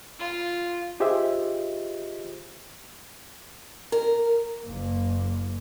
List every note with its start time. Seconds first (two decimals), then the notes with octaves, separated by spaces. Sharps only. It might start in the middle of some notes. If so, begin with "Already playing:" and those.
0.19 F4
1.00 F4 G4 G#4 C5 D#5 E5
3.92 A#4
4.64 F#1 A#3